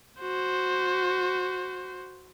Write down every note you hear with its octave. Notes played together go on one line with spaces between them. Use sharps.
F#4 C5